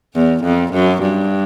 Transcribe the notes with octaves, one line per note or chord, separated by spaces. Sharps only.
E2
F2
F#2
G2